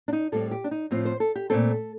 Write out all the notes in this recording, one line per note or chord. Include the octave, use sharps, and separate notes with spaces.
D4
D#4
A2 G3 C4 A4
G4
D4
D#4
A2 F3 C4
C5
A4
G4
A#2 A3 C4 A4